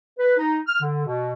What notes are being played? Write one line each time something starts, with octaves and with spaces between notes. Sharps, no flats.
B4
D#4
F6
D3
B2